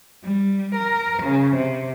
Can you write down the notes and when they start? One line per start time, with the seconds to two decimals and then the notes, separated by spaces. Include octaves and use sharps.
0.24 G3
0.75 A#4
1.23 C#3
1.57 C3